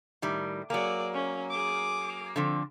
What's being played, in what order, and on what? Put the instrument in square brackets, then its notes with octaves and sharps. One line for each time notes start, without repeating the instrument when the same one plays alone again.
[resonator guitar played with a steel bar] A2 D#3 G3
[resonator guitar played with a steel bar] F#3 A#3 [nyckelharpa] G#4 D5
[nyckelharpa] C#4
G#4 D6
[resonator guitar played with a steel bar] D3 F3 C4